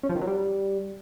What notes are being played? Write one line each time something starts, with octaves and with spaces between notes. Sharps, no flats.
C#4
F3
D#3
F#3
G3